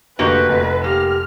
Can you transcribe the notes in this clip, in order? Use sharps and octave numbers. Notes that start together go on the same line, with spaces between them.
F1 D3 A#3 F#4 G4 B4 D#5
F1
A#3 G4 F6